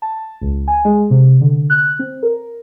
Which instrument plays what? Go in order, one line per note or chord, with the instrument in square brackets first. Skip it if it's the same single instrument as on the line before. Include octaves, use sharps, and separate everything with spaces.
[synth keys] A5
C#2
G#5
G#3
C3
D3
F#6
C4
A#4